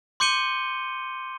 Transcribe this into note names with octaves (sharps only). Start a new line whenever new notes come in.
C6 D6 G6 C#7 D#7 G7